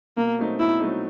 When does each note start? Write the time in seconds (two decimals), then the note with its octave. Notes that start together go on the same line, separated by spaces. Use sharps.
0.17 B2 A#3
0.38 F#3 A3 C4 D#4
0.60 B2 E4
0.80 F#3 A3 C4 D#4